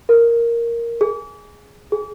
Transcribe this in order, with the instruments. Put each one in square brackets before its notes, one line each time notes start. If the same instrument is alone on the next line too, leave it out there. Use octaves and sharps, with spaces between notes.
[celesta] A#4
G#4
G#4